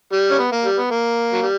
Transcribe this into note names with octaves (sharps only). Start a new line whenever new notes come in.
G3
C#4
B3
A#3
G3
B3
A#3
F#3
G3